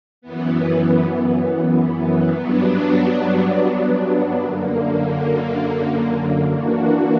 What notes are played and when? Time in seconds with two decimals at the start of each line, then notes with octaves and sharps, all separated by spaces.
0.22 F#2 E3 B3
2.31 G2 F#3 B3 D4
4.41 F#2 D3 A#3
6.52 E3 A#3 D4 F#4